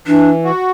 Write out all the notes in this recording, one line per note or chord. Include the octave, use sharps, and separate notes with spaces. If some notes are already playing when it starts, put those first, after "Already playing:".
E3 D4
F#4